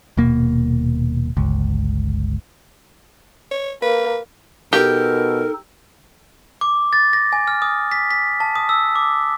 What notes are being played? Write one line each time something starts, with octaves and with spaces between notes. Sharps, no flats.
D#1 B2 A#3
G1 C#2
C#5
A#3 B4
B2 D#4 G4 A4 A#4
D6
A6
A#6
G#5
F6
D#6
B6
B6
A5
D#6
E6
D6